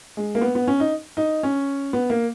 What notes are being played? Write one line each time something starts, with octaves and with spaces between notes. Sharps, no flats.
G#3
A#3
B3
B3
C#4
D#4
D#4
C#4
B3
A#3